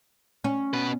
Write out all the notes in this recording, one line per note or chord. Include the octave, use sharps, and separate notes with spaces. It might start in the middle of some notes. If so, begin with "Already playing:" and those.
C#4
B2 B4